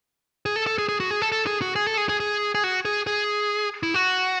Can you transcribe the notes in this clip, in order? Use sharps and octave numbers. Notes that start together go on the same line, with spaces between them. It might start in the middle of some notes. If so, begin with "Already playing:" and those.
G#4
A4
A4
G#4
G#4
F#4
G#4
A4
A4
G#4
F#4
G#4
A4
G#4
G#4
G#4
G#4
F#4
G#4
G#4
E4
F#4